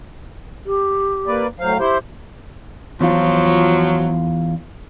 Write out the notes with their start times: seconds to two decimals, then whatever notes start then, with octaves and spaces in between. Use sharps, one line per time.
0.66 G4
1.27 A#3 B4 D5
1.60 A2 F#3 C5 F5
1.79 E4 G4 C5
3.01 E2 F3 F#3 F4